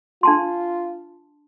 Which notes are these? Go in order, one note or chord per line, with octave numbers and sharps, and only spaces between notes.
D4 F4 A5 C6